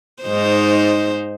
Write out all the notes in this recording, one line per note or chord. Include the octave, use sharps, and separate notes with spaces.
G#2 D#4 C5